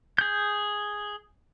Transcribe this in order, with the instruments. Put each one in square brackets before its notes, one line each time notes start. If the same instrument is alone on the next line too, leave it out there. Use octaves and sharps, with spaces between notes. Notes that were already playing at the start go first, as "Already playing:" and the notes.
[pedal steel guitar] G#4 G6